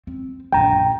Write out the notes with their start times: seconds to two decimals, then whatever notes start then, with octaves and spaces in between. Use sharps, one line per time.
0.07 C4
0.52 A#1 F#2 G5 A#5